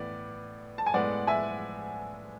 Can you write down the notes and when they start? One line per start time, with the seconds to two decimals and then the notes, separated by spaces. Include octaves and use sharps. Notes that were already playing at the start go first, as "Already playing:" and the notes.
Already playing: A2 E3 B3 D5
0.78 A5
0.86 G#5
0.94 A2 G#3 B3 D5 F#5
1.27 E5 G#5